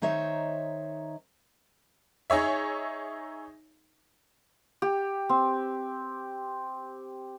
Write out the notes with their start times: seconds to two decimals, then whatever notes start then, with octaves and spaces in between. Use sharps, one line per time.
0.02 D#3 D#4 C5 C#5 E5
2.30 D#4 G#4 C#5 E5
4.82 G4
5.29 C4